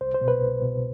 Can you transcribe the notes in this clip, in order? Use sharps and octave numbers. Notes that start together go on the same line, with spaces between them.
C2 C5
C5
B2
B4
C2
B2